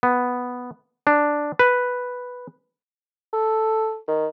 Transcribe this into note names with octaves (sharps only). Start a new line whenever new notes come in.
B3
D4
B4
A4
D#3